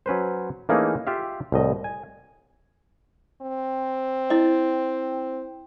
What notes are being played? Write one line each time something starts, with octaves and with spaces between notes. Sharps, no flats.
F#3 C#4 B4 C5
E3 A3 A#3 C#4 D#4 G#4
F4 G4 E5 F5
C2 A2 D#5
G#5
C4
E4 D#5